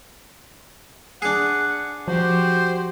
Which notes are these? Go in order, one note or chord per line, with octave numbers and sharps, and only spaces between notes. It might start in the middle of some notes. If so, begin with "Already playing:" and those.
D4 G#4 F#5
F3 F#4 G4 C5